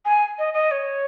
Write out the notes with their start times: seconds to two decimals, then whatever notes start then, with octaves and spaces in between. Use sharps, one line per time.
0.05 G#5
0.39 D#5
0.54 D#5
0.71 C#5